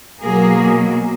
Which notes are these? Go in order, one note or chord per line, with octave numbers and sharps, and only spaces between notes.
B2 F#3 A#3 G#4 A#4